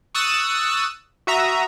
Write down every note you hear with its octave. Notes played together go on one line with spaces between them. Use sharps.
C#6 D#6 E6 F#6 A6 D#7
F#4 E5 A#5 D#6